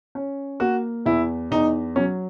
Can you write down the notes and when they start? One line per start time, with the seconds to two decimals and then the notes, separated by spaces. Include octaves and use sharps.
0.15 C#4
0.60 A#3 F#4
1.06 E2 E4
1.51 E2 D#4
1.96 F#3 C#4